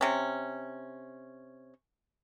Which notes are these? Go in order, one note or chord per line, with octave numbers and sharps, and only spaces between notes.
C3 C#4